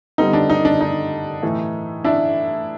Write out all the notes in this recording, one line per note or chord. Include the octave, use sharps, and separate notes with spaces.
D3 G3 B3 D#4
D4
D#4
D4
D#4
A2 E3 A3
D4 E4